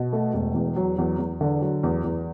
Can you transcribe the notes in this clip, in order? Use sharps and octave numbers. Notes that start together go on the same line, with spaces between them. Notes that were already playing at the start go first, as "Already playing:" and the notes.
Already playing: B2
A3
E1
E2
F#3
E2
E2
D3
F#3
E2
E2